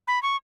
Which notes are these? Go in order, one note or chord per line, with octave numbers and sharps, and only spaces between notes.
B5
C#6